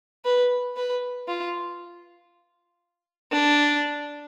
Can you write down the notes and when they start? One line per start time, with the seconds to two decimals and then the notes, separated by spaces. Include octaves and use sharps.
0.25 B4
0.77 B4
1.28 F4
3.32 D4